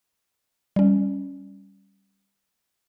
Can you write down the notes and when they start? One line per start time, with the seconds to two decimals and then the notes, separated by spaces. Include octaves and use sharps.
0.76 G3 C#4